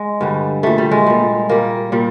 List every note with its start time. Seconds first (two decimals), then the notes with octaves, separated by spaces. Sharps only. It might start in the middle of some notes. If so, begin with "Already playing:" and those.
Already playing: G#3
0.21 G2 D3 G3
0.63 A#2 G3 A3
0.78 G3
0.91 G#3
1.06 A#2 G3
1.49 A#2 G3 A#3
1.92 A#2 G3